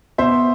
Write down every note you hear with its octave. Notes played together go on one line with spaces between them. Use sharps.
B2 C5 E5